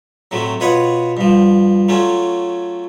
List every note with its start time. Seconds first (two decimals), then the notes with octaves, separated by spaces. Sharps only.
0.31 A2 C3 F#3 A3
0.60 B2 F4 B4 C#5 F#5 D#6
1.17 G2 F3
1.89 F#3 A3 C#4 F4